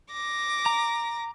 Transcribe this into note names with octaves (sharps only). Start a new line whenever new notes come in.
D6 A#6
A#5